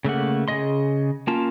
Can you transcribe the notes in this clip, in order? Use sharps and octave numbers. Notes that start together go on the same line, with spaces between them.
C#3 A3 A#3 F#5
C#3 A#3 G#4 D#5 C6
A#3 C#4 F4 A5